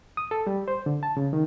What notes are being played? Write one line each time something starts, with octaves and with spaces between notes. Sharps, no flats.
D#6
A4
G3
C5
D3
A5
C#3
D#3